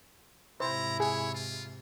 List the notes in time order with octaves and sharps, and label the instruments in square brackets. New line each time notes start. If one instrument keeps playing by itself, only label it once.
[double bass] G#2 C3 [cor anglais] E4 [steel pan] C5 [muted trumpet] A#5
[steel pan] G#4 [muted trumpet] C#5
[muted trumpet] F4